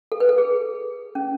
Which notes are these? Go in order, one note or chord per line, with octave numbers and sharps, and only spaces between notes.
A4
B4
A4
G#4
C#4